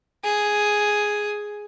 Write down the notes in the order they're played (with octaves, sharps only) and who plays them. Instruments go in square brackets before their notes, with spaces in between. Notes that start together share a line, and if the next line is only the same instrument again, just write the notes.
[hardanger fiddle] G#4